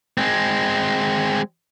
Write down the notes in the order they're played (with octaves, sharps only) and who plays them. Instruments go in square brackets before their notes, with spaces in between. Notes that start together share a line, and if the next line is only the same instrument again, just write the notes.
[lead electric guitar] G#3 C4